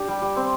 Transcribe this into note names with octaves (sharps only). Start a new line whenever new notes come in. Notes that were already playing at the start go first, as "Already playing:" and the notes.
Already playing: D4 G4
G3
G3
C4